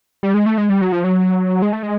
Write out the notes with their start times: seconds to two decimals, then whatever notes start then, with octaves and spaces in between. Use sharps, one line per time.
0.23 G3
0.34 G#3
0.46 A3
0.58 G#3
0.69 G3
0.81 F#3
0.92 F3
1.04 F#3
1.62 G#3
1.73 A3
1.83 G#3